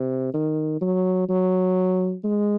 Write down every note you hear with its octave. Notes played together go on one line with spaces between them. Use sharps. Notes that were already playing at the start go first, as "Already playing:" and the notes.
Already playing: C3
D#3
F#3
F#3
G#3